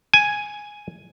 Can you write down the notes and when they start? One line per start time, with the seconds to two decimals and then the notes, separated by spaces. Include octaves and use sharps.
0.14 G#5